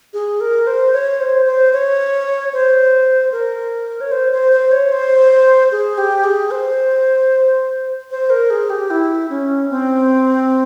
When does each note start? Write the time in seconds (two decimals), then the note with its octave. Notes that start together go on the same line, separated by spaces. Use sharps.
0.14 G#4
0.41 A#4
0.67 C5
0.93 C#5
1.20 C5
1.46 C5
1.73 C#5
2.53 C5
3.32 A#4
4.01 C#5
4.12 C5
4.33 C5
4.52 C5
4.72 C#5
4.92 C5
5.72 G#4
5.98 G4
6.24 G#4
6.51 C5
8.11 C5
8.30 A#4
8.50 G#4
8.70 G4
8.90 E4
9.30 C#4
9.70 C4